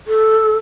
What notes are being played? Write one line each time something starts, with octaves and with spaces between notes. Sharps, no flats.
A4